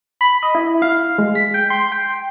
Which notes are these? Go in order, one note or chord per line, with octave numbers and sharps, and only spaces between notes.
B5
D#5
E4
F5
G#3
B6
G5
C6
G5